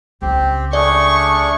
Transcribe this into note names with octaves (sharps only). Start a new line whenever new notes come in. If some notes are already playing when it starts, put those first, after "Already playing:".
C#2 C#3 C4 G4
A3 D4 G#4 D5 C#6